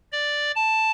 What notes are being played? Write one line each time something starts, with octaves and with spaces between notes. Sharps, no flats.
D5
A5